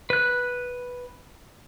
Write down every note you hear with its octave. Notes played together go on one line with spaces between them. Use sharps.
B4 F#6